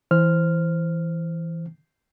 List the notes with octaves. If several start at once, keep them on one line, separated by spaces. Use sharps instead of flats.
E3 C5 F6